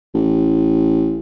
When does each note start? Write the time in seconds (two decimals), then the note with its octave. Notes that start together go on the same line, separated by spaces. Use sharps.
0.14 A1